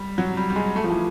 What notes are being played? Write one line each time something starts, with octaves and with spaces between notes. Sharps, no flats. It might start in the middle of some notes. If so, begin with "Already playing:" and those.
Already playing: G3
F#3
G3
G3
G#3
A3
F3
E3